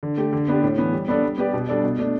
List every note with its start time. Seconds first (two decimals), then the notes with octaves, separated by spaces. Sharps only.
0.03 D3
0.17 A3 G4
0.33 D3
0.48 B3 D4 G4
0.63 A2
0.78 E3 B3
0.93 G3
1.08 B3 D4 A4 D5
1.23 G3
1.38 B3 G4 B4 D5
1.53 B2
1.69 G3 D4 A4 D5
1.84 B2
1.99 A3 D4